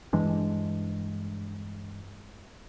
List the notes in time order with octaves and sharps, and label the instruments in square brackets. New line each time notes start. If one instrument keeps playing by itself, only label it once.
[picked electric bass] G2 E3 G#3 D4